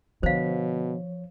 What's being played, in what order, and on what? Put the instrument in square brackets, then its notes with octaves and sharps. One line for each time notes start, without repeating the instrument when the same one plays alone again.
[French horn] B2 [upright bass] D3 [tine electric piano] F3 C#5 [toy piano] C5 F5